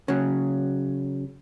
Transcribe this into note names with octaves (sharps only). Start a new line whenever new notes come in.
C#3 F#3